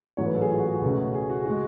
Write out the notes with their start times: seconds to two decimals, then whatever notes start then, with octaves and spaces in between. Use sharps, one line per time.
0.17 A1 G#2 F#3 A3 C#5
0.26 B4
0.34 A4
0.41 G#4
0.50 F4
0.58 F#4
0.66 G#4
0.74 F#4
0.81 C#2 B2 A3 C#4
1.14 G#4
1.29 F#4
1.41 G#4
1.46 G#3 F#4